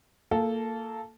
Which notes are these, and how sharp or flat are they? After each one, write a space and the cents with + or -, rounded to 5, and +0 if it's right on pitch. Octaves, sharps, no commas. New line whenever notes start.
A#3 -25 F4 +0 A4 -10